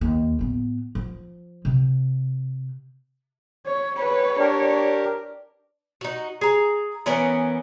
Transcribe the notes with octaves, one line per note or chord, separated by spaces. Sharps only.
D#2
A2 B3
F3
C3
C#5
B4 C#5
D4 G4 A#4
D#4 F#4
G#4 A#5
E3 B3 C#4 A#4